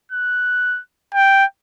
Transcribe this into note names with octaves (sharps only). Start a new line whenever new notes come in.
F#6
G5